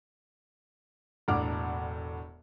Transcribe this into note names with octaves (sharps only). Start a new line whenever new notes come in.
E1 A2 D4 F#5 D6 F6